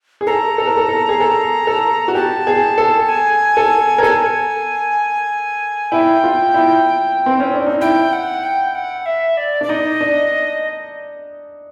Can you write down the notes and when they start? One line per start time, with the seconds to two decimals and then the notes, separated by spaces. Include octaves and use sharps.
0.21 G#4
0.27 A4 A#5
0.58 A4
0.67 A#4
0.77 A4
0.89 A4
1.09 G#4
1.21 A4
1.67 A4
2.08 F#4
2.15 G4 A5
2.47 G#4
2.78 A4
3.09 G#5
3.57 A4
3.98 A#4
4.03 A4 G#5
5.92 E4 G5
6.24 F4
6.54 E4
7.26 C4
7.40 C#4
7.54 D4
7.66 D#4
7.81 E4 G5
8.13 F#5
8.43 G5
8.75 F#5
9.06 E5
9.37 D5
9.61 D4 D5
9.69 D#4 D#5
10.01 D4